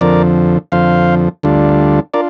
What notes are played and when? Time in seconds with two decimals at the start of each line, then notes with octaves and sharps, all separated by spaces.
0.01 F2 D3 F3 A#4 D5
0.72 F2 D3 F3 C5 F5
1.43 D2 D3 G3 D4 F4
2.14 D4 F4 A#4 D5